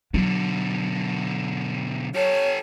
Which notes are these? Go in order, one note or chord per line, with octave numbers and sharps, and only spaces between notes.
B2 D3 F#3
G4 A4 C#5